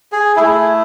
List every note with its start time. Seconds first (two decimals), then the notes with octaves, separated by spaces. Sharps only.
0.12 G#4
0.36 A3 E4 G#4